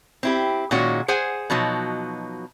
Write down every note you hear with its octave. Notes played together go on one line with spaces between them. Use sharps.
C4 E4 G4
A#2 D#3 G#3 C#4 F#4
G#4 C5 F#5 G#5
B2 F3 F#3 D#4